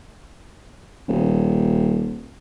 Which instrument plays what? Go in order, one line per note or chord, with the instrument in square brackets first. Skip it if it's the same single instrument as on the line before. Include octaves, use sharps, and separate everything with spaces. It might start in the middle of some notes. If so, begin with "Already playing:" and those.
[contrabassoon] D#1